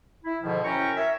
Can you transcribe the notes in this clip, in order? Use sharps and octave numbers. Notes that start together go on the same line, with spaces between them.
E4
G#2 B2 D3 D#3 F3
F#2 C#4 E4 G5 A#5 C#6
A#4 C#5 E5